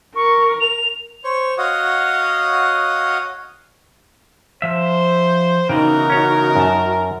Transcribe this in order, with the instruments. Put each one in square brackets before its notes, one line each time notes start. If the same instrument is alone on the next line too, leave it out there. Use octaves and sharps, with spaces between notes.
[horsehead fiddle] A#4 [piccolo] C#6
[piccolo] F7
[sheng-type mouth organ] C5 C#5 C#6
F#4 C#5 D#5 F5 F#5 D#6
[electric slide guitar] F3 E5 [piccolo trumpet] C5
[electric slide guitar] C#3 E3 B3 [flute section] D#4 F#4 [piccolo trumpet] A#4 [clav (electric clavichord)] G5
[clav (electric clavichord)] C#4 C#5
F#2 A5